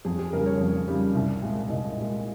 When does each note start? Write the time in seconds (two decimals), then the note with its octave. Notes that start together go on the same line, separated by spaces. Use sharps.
0.05 F2 G#4
0.19 G#4
0.33 C#3 G3 A#4
0.46 C#5
0.60 F2
0.88 C#3 G3
1.15 C2
1.42 A#2 G#3
1.70 C2 D#5
1.97 A#2 G#3